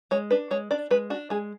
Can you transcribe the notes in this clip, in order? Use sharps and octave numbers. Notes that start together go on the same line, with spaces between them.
G#3 C#5
D4 B4
G#3 C#5
D4 D5
G#3 B4
D4 F#4
G#3 G#4